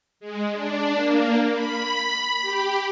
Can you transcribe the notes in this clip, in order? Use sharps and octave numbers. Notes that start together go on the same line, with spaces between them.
G#3
D4
A#3
B5
G4